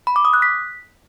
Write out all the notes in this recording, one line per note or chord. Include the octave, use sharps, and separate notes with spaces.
B5
D6
D#6
F#6
B6